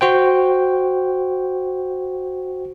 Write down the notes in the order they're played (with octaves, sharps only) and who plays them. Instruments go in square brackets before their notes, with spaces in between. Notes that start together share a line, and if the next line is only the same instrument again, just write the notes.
[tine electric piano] F#4 C5 G5